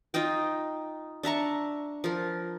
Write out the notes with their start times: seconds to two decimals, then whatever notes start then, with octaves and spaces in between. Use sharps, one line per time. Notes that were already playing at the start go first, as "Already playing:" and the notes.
0.14 D#4 F4 D#5 G5
1.23 D4 E5 A#5 C#6
2.04 F3 A#4